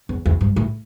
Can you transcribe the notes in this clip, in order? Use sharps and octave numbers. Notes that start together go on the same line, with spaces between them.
E2
E2
G2
A2